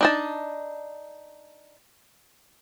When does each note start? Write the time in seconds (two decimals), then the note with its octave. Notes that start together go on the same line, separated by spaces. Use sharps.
0.01 D4 D#4 A5